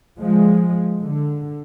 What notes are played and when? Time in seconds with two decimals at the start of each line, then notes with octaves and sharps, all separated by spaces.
0.18 F3 G#3
1.02 D3